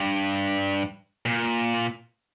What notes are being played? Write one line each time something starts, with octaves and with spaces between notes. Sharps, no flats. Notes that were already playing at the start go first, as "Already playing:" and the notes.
Already playing: G2
A#2